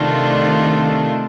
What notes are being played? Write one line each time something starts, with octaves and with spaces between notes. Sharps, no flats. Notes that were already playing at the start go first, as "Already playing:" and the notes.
Already playing: C3 D#3 A3 D4 F4